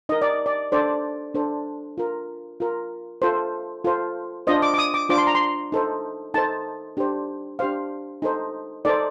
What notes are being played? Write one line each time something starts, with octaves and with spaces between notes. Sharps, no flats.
D#4 A#4 D#5
D5
D5
D4 A4 C5 D5
D4 A4 C5
F4 A#4
F4 A#4
F4 A4 C5
F4 A4 C5
D4 F4 C5 D#5
D6
D6
D#6
D6
D4 F4 C5 D6
C6
A#5
C6
D#4 A4 C5
D#4 A4 C5 A5
D4 G4 C5
D4 G4 C5 F5
D#4 A4 C5
D#4 A4 C5 D5